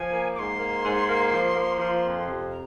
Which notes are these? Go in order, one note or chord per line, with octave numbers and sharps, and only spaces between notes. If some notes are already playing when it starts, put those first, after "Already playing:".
Already playing: F3 G#5
A#3
G#2 C6 D6
A#3
G#2
A#3
F3
A#3
F3
F2
C3
A#5